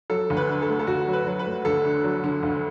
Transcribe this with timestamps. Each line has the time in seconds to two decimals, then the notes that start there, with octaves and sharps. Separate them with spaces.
0.10 F#3 A4
0.30 D2
0.37 B4
0.48 D3
0.62 A4
0.69 A3
0.79 A4
0.87 D2 F#4
1.08 F#3
1.13 B4
1.27 F#3
1.39 B4
1.46 A3
1.65 D2 A4
1.84 D3
2.04 F#3
2.24 D3
2.43 D2